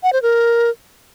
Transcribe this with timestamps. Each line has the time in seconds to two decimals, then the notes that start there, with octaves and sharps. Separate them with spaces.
0.03 F#5
0.13 C5
0.22 A#4